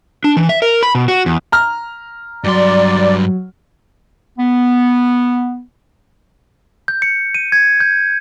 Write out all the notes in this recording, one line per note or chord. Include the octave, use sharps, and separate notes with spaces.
D4
E3
E5
A#4
B5
B2
F#4
E2
A#5 F6
G2 F#3 D5 C6
B3
G6
C#7
D#7
G#6
G6